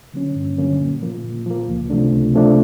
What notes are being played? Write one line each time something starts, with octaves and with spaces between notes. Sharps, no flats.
D3 F#3 A#3 C#4
G2
D3 F#3 A#3 C#4
A#2
F3 A#3
A#2
F3 A#3
C#2
C3 F3 A3 D4
C#2
C3 F3 A3 D4